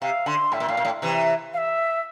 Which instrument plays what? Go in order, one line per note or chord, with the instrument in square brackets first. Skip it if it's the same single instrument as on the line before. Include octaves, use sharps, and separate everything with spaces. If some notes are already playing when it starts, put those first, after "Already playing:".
[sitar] C3 [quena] F5
[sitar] D3 [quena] C6
[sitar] A2 [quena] E5
[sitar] A#2
[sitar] A2 [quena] F5
[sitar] A#2
A2
C3 E3
[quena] F5
E5